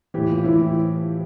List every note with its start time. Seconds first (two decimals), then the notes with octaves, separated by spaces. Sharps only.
0.14 A2 E3 G4
0.29 F4
0.44 A2 E3 E4
0.60 E4